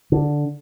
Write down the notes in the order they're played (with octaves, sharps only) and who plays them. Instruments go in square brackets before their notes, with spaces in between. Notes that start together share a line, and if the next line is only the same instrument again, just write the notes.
[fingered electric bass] D3